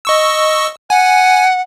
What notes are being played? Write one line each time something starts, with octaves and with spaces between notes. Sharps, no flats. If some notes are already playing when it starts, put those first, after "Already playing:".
D#5 C#6 E6
F#5 G#5